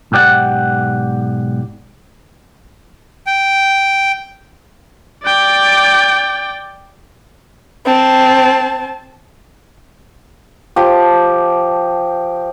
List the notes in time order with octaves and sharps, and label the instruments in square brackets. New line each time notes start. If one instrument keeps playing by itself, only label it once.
[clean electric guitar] B1 G#2 G4 D5 F#5
[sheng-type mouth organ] G5
[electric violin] D5 G5
[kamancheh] C4 A5
[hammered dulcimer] F3 G4